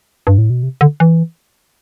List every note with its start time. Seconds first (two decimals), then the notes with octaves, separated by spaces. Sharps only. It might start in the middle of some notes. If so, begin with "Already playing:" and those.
0.27 G2
0.38 A2
0.50 B2
0.63 C3
0.81 D3
1.00 E3